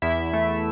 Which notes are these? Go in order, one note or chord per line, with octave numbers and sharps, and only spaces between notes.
E2 E4 E5
A3